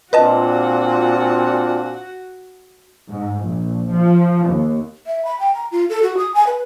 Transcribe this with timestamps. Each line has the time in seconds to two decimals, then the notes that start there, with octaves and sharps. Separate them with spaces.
0.13 A#2 C4 D4 F4 F#4 B4 D#5 A5
3.09 G#2
3.44 A#1
3.93 F3
4.49 D#2
5.07 E5
5.25 B5
5.40 G5
5.55 A#5
5.72 F4
5.89 A4
6.02 F#4
6.18 D#6
6.34 G#5
6.47 B4